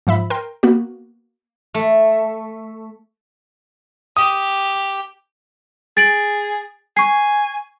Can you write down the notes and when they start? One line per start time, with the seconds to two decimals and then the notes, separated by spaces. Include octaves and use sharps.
0.07 G#2 F3 E5 B5
0.30 A#4 G5 C6
0.63 A#3 B3 F#4
1.74 A3
4.17 G4 D#6
5.97 G#4 A6 D7 F#7
6.97 G#5 C#6 C7